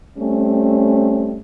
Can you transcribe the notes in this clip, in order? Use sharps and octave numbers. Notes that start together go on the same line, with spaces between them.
G3 A3 C4 C#4